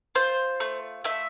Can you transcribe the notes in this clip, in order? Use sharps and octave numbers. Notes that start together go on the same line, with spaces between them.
F4 C5
A3
A3 E5